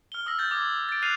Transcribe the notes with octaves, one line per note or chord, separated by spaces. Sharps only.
F6 G7
D#6 E6 A#6
G6 A6
D6 D#6 G#6
A6 D7
F6 F#6 C7 D#7 F7